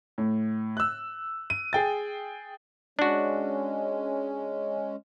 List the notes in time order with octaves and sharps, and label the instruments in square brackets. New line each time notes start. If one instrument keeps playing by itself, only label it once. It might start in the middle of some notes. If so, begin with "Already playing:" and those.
[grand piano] A2
E6 F#6
D#7
G#4 G5 A6
[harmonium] G#3 C#4 [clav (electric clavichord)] D4 F#4